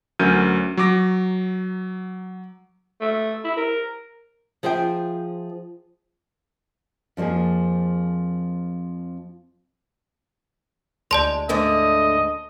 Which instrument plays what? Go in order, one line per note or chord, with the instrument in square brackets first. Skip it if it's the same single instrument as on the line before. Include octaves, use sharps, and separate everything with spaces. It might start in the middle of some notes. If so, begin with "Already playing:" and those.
[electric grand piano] D2 F#3 C#4 A#4 G6 D#7
F#3 C#6 D6 A#6
[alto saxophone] A3
E4
A#4
[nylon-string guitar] F3 G#4 C5 E5 G5
F2 F3 G3 A#3 G#4
[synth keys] D2 [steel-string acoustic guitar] G#3 [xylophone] D5 A5 C6
[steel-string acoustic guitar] G#2 D3 A3 [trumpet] D#5